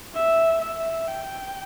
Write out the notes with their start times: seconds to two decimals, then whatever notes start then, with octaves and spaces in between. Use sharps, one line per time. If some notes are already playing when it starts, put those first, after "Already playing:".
0.15 E5
0.62 E5
1.08 G5